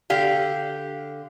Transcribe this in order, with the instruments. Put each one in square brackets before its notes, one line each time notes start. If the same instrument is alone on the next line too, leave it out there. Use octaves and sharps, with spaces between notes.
[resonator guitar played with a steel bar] D3 G4 F5